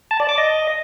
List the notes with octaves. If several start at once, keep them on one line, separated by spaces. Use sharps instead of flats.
A5
D5
D6
D#5